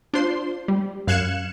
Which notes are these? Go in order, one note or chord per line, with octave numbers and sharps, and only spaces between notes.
D4 F4 C5 C6
G3
F#2 F5 F#6 G#6 C#7 E7